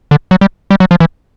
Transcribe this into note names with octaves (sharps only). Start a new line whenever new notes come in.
D3
F#3
G3
G3
F#3
F3
E3